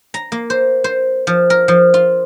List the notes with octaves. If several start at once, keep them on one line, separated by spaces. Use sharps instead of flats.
A#5
A#3
C5
C5
F3
A#4
F3
F4